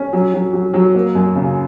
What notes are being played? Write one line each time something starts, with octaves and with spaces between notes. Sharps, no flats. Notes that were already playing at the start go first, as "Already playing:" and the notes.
Already playing: C#4
F#3
F#3
F#3
F#3
A#3
F#2
C#3